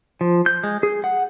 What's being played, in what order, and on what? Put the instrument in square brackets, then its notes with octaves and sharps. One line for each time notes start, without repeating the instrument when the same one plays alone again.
[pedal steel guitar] F3
G6
G#3
G#4
F#5